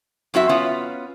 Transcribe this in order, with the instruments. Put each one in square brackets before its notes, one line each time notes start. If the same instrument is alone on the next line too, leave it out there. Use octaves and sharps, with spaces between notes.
[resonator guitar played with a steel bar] F#2 C4 F#4 E5
B3 C#4 F4